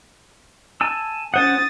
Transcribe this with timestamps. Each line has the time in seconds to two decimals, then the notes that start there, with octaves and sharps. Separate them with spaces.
0.81 G#5 A5 E6
1.34 C#4 C5 F#5 D#6 A6